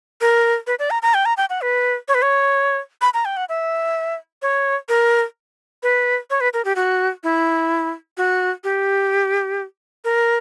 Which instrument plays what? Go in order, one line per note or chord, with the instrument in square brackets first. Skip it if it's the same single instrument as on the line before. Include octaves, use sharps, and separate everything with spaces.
[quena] A#4
B4
D5
A#5
A#5
G5
A#5
G5
F#5
B4
C#5
B4
C#5
B5
A#5
G5
F#5
E5
C#5
A#4
B4
C#5
B4
A#4
G4
F#4
E4
F#4
G4
A#4